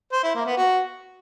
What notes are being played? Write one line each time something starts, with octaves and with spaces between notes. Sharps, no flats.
C5
E4
A#3
B3
F#4